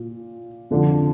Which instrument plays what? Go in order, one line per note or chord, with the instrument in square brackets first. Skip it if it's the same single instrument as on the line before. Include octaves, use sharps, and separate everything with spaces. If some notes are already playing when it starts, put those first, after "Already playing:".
Already playing: [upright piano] A#2
F2 D3 F3